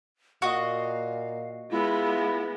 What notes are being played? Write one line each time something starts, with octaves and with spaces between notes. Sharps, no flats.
A#2 F#4 D#5 F5
G#3 B3 E4 F4